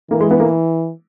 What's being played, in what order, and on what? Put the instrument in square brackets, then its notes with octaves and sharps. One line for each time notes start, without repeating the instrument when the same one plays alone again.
[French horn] E3 [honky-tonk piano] A#3
[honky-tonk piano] G#3
B3
A#3